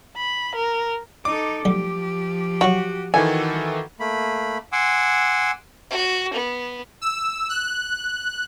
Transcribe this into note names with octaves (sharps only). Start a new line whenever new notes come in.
B5
A#4
D#4 A4 D6
B1 F3 G3 A3 G4
F#3 F#4 F5 G5
D#3 E3 F#4 A4 G#5
A3 A#3 B5
F#5 G#5 C6 D6 E6
F#4
B3
E6
F#6